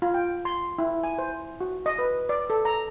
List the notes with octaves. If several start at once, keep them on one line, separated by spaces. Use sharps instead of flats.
F4
G5
C6
E4
G#5
C5
F#4
D#5
B4
D5
A4
A#5